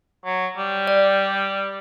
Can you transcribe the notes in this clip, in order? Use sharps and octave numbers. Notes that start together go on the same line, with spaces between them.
F#3
G3
D5